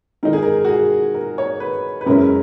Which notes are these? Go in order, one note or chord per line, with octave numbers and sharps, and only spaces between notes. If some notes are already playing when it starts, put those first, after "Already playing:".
D#3 G#3 D#4 A#4
G#4
A#4
F#4
G#4
A#4
C#5
B4
B4
F#2 C#3 G#3 C#4 E4 A#4